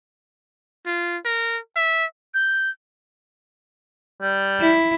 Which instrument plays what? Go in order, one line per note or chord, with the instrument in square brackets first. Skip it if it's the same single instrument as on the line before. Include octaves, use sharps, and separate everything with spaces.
[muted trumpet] F4
A#4
E5
[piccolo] G6
[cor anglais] G3
[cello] E4